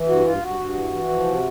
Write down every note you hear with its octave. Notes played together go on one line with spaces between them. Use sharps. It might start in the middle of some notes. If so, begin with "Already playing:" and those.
Already playing: E3
G2 F#4
G2 F4
G2 F#4
G2
E3
E3
F3
C3